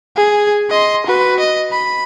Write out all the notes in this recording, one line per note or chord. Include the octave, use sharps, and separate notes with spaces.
G#4
D#5 C6
F#4 B4
D#5
B5